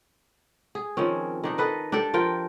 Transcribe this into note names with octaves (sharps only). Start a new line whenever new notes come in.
G#4
D#3 F3 C4 C#4
D#3 D4 D#4
A4 B4 D#5
D4 G4 A4 D5
F3 F4 A#4 G5